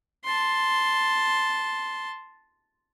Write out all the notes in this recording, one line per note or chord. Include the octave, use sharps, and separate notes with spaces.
A5 C6